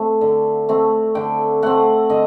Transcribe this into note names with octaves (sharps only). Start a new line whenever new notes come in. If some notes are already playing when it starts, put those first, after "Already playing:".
Already playing: A3 C4
D3
A3 C4
D3 G5
A3 C4 F#5
D3 D#5